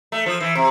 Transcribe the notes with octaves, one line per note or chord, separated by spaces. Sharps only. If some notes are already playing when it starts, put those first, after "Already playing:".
A3
F3
E3
C3